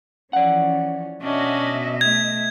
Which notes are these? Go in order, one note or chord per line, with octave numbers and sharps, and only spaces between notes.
E3 F3 C#4 D5 F#5
B2 C#4 D4 F#4 D#5 E5
A3 G#6